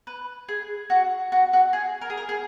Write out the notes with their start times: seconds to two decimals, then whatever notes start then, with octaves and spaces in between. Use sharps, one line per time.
0.07 B4
0.48 G#4
0.90 F#4
1.32 F#4
1.53 F#4
1.73 G#4
2.01 A#4
2.10 G#4
2.17 A#4
2.29 G#4